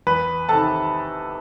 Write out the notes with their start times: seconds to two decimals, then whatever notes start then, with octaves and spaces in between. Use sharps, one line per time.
0.07 E2 B4 B5
0.49 C3 D#3 A4 A5